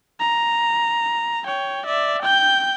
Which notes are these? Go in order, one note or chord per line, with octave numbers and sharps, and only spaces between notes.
A#5
C#5 G5
D5 E5
G5 G6